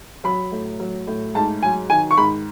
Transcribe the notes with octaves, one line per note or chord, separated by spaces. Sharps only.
F#3 B5
A2
F#3
A2
G#2 A5
F#3 G#5
D#3 G#5
C#6
G#2 B5